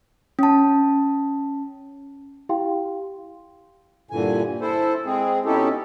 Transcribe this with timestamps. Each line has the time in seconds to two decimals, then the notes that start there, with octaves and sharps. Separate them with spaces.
0.39 C#4 A5
2.49 E4 G4 F5 G5 C6
4.11 G2 A#2 D3 E3 G#5
4.61 E4 A4 C5
5.05 G#3 C4 G#4
5.45 B2 C#4 D#4 E4 G4 A4